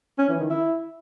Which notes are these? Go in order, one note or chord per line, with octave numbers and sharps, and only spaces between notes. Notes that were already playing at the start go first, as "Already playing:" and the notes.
C#4
E3
D#3
E4